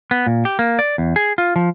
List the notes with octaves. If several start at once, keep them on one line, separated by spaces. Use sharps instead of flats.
B3
A#2
G4
A#3
D5
E2
G#4
F4
F3